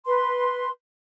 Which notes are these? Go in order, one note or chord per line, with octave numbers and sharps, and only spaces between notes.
B4 C6